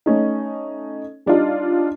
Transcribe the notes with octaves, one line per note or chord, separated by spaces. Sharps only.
A3 C#4 D#4
G3 D4 D#4 F4